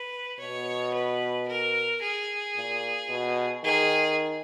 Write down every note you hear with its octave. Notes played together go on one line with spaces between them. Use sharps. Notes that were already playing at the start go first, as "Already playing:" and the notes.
Already playing: B4
B2 C#5
B4
A#4
G#4
A#2
B2
D#3 G#4